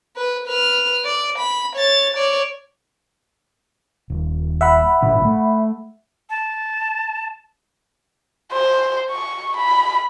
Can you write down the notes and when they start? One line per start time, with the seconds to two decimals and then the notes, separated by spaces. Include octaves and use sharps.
0.17 B4
0.48 B4 F6
1.05 D5
1.39 B5
1.76 C#5 A6
2.13 C#5 D5
4.10 D#1
4.61 E5 F#5 B5
5.02 G#1 A#2 D4
5.25 A3
6.30 A5
8.52 C5
9.10 C#6
9.56 B5